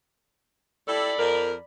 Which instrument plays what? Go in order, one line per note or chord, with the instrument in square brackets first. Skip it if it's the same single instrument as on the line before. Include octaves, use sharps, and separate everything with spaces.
[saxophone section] E4 G4 A4 [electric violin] D5 B5
[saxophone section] F2 A#4